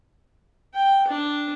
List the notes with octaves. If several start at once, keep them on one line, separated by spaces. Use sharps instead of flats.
G5
D4